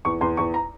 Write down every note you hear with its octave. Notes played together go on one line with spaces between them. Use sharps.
E2 C#6
E2 C6
E2 C#6
A#5